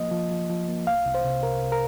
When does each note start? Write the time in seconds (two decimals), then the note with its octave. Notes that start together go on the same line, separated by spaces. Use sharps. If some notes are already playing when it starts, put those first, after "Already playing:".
Already playing: F3 A#3 D#5
0.11 F3
0.31 F3
0.49 F3
0.68 A#3
0.87 C2 F5
1.06 C2
1.15 C5
1.24 C3
1.43 C2 A#4
1.63 C2
1.72 A#4